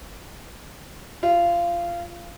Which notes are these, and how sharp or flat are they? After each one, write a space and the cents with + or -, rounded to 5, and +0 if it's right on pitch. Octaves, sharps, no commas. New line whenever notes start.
F4 -20